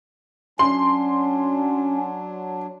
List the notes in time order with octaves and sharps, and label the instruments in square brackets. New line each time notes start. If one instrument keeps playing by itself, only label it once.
[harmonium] F#3 D4 [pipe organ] C#4 [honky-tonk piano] C6